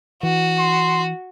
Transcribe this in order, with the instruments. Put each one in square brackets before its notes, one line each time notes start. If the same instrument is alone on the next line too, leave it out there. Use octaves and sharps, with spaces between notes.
[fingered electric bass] E3 [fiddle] F#4
[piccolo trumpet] C6